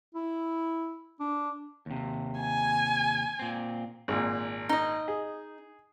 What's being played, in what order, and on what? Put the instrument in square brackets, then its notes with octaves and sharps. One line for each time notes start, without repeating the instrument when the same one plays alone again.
[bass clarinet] E4
D4
[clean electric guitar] D#2 C3
[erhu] G#5
[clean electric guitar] A#2 C4
[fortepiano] G#1 A#2
[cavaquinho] D#4 D#5
[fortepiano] G#4